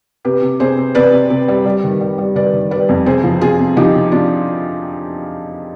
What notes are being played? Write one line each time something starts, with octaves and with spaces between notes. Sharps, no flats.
C3 G4 B4
C3
C3 G#4 C5
C3
C3 B4 D5
C3
C3
G3
G3
D#3
G3
G3
D#3 B4 D5
D#3
G3 B4 D5
F2
C3 G#4 C5
F3
C3 F4 G#4
C3
F3 D#4 G4
C3
C3 D4 F4